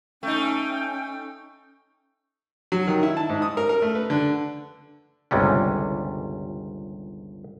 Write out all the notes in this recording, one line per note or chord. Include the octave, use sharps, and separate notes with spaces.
A3 C#4 D#4 G5
F#3
D#3
E4
A5
G#2
D#6
A#4
A#4
A3
B4
D3
G1 C#2 C3 G3 C#4